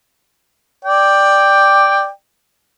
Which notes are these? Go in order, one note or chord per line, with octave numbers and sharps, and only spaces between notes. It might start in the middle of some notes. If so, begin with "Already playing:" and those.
D5 G5